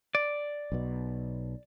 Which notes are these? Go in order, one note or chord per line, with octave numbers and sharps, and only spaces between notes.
D5
B1 B2